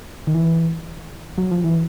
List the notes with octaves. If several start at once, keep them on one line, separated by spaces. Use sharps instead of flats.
D#3
E3
F#3
F3
E3